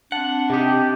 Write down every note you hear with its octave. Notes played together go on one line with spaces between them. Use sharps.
C4 D4 F#5 A5
C3 D#4 G4